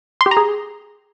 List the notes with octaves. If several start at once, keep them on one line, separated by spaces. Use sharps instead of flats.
C6
G4
A#5
G#4